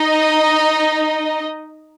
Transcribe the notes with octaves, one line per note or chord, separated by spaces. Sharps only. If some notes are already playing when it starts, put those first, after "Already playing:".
Already playing: D#4 D#5